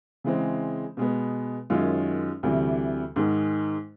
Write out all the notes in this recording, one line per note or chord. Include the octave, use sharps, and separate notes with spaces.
C#3 E3 G#3 C4
B2 G#3 B3
F#2 D#3 G#3 C#4 F4
D2 C3 E3 G3
G#2 D#3 G#3